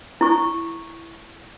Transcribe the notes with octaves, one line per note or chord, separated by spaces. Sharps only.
E4 C#6